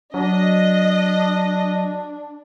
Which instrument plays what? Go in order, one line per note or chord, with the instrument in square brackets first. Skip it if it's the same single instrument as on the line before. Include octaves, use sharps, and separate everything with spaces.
[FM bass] F#3 [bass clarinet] D4 [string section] D#5